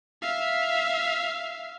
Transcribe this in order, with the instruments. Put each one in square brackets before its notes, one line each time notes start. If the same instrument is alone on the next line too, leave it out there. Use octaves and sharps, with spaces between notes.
[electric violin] E5 F5